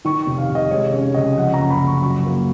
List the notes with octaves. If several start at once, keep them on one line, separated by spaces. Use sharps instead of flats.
D#3 C#6
F1
F5
F1
D#5
G#3 C#5
C#4 C#5
C#2 D#5
F3 F#5
A#5
F#1
B5
F#1
C#6
F#3 C#6
A#3